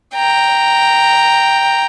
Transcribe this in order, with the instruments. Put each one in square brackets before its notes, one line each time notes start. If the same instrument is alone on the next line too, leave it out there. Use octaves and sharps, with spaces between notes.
[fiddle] G5 A#5